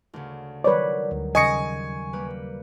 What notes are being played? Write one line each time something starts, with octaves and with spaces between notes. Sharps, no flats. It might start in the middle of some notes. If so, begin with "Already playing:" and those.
D2 C#3
D#3 F#3 G3 B4 C#5 D5
D2
D#2 C#3 D#5 G#5 C#6 C#7
G3 A#3 B4